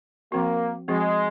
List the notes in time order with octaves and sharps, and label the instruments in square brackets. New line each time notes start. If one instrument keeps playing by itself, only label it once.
[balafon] F3 C4 F#4 [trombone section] A#3
[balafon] F3 C4 F#4 [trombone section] G#3